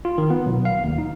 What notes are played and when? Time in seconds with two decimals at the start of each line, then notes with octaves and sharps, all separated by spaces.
0.05 F4
0.18 D#3
0.30 B3
0.46 B1
0.65 F5
0.84 D#2
0.98 D#4